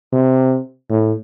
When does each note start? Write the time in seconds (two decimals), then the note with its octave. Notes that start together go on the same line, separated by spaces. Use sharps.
0.13 C3
0.90 A2